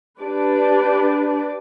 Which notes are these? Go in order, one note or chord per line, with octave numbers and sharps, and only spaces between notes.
D4 G4 B4 D5